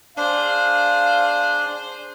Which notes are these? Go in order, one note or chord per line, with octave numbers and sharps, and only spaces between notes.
D4 G#4 C5 F5